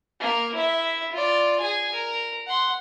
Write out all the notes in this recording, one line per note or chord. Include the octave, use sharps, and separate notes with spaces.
A#3 A#4
E4 E5
F4 D5
G#4 G#5
A#4
F#5 C6